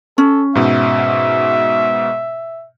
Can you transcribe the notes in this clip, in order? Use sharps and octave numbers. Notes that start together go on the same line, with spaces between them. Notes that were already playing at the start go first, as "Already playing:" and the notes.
C#4 A4
G#2 B2 E5